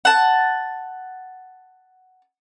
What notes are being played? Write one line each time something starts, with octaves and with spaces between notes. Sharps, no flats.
F#5 A5